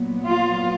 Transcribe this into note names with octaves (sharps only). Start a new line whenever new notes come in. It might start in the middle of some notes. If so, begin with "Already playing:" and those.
Already playing: A#2 F#3 B3
F4